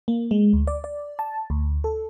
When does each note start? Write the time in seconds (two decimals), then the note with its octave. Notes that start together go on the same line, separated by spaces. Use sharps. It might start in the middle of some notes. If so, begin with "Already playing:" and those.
0.08 A#3
0.31 G#3
0.53 D2
0.67 D5
0.84 D5
1.19 A5
1.50 D2
1.84 A4